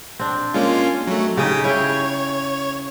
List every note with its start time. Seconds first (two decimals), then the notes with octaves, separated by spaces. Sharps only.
0.19 C4 D4
0.54 G#3 A#3 C#4 F4
1.07 F#3 A3
1.37 C#3 C#4 D#4 G4 G5 D#6
1.64 E4 G#4 C#5 G5